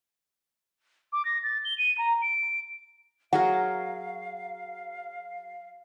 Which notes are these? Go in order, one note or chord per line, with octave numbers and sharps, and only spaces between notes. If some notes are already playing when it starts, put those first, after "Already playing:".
D6
A#6
A6
G7
D#7
A#5
D7
F#3 G#4 A#4 F5 F#5